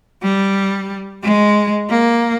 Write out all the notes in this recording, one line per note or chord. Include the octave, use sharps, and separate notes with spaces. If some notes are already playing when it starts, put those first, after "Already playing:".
G3
G#3
A#3